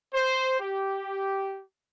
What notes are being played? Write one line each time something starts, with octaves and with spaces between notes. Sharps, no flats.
C5
G4